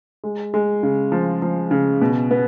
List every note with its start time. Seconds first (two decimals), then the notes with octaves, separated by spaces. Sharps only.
0.24 G#3
0.54 G#3
0.83 C#3
1.12 F3
1.42 F3
1.71 C#3
2.02 B2
2.31 B3